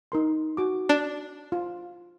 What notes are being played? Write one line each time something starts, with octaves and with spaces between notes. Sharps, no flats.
D#4 A#4 C6
F#4 D6
D4
F4